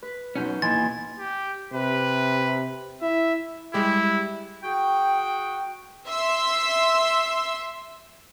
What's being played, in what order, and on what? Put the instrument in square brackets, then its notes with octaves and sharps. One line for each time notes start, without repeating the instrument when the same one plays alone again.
[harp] B4
[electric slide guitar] F#2 C#4 [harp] B2 F#5 G6 [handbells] D#4
[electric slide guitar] E2 A#2 E3 [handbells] D#5 C6 G#6 [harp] G#5 [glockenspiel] A6
[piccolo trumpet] G4
[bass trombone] C3 [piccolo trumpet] B4
[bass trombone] E4 [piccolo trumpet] E5
[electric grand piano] G3 G#3 G4 [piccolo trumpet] E4
[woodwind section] F#4 G#4 G5
[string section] E5 C6 E6